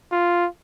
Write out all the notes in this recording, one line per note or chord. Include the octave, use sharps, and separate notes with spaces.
F4